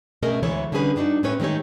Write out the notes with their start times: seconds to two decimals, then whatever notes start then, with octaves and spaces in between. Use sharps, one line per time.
0.22 B2 A3 C#4 G#4 A#4 D#5
0.43 D2 E3 G#3 A4 C#5
0.72 D3 G3 C#4 G#4 B4
0.96 G2 D4 D#4 F#4
1.23 A2 C4 C#4 B4 C#5
1.40 D#3 G#3 A3 G4 C#5